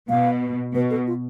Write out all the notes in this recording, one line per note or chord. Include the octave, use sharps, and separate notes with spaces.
B2 F5
B2 B4
A4
F4